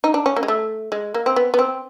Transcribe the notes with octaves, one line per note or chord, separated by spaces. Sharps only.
D#4
D4
C#4
A#3
G#3
A3
G#3
A#3
C4
B3
B3
C4